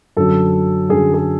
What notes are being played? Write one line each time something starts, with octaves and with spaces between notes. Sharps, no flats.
F#2 D3 F#3 A4
F#2 D3 F#3 G#4
G#4